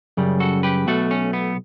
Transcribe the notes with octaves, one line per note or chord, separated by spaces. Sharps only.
F#2 C#3 G3
F#4 A4
G4 B4
B1 B2 A3 F#4 A4
C#4
B3